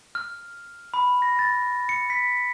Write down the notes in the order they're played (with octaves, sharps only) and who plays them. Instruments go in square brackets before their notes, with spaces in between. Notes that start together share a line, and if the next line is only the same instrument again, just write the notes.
[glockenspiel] F6
B5
A#6
A6
C#7
B6